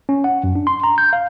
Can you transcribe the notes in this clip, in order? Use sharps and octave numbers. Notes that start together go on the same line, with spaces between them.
C#4
F#5
F#2
D4
C6
A#5
G6
F5